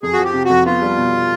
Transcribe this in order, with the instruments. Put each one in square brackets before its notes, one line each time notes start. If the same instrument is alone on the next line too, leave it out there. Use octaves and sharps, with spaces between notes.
[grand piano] F2 [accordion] G#4
[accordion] F#4
[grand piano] F3
[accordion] G4
[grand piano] C3
[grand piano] F2 [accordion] F#4
[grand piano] B3 [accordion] F4
[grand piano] G3
B2